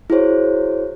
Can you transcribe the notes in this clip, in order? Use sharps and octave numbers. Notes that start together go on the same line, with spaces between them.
E4 F#4 G#4 C5 C#5